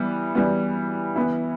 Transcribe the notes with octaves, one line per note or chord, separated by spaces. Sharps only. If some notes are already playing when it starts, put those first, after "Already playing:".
Already playing: E3 G3 B3
E3 G3 B3
E3 B3 E4